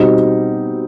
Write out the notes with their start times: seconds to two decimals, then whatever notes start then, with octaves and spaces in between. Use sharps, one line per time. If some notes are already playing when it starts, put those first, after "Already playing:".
Already playing: B2 G3 C4 D#4